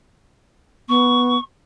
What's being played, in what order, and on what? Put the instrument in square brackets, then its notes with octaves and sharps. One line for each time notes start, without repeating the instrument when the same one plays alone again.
[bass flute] B3 [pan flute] C#6